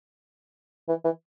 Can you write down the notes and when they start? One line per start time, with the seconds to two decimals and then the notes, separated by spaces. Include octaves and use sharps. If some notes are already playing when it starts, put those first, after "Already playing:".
0.89 E3
1.04 E3